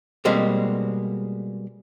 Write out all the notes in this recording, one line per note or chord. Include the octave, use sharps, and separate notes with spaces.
B2 G3 G#3 A#3 C4